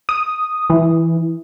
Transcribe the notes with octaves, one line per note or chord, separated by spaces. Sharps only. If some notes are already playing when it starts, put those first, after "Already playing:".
D#6
E3